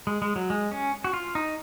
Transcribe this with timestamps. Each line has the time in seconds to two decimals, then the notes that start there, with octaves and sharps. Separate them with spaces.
0.07 G#3
0.22 G#3
0.36 F#3
0.50 G#3
0.72 C#4
1.04 F#4
1.14 F4
1.35 D#4